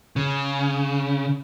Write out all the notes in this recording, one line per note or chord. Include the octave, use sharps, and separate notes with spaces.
C#3